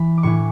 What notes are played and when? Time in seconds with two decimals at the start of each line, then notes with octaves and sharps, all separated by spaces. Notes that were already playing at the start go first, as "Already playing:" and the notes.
Already playing: E3 B5
0.18 D6
0.23 A2 E3 C#6